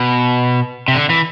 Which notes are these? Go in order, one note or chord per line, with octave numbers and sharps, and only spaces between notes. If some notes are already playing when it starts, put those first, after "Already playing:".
Already playing: B2
C3
D3
E3